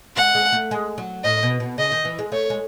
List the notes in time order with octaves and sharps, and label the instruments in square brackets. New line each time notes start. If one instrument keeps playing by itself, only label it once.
[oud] G#3 [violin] F#5
[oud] G#3
A3
G#3
F#3
[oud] A2 [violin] D#5
[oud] B2
B2
[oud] C#3 [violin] D#5
[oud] D#3
E3
G#3
[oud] A3 [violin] C#5
[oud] G#3